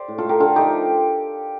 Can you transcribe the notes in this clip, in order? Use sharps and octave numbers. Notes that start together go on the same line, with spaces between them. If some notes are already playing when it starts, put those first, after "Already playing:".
Already playing: G4 C5 D5
A2
F4 A4
A3 G4 A#4
D3 F4 A4
F3 A3 D#4 G4